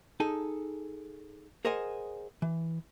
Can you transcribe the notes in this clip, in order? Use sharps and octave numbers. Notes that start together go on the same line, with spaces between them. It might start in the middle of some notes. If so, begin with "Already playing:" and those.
D#4 G#4 A4 G#5 A5
G#4 A#4 C5 D#5 F#5 G#5
E3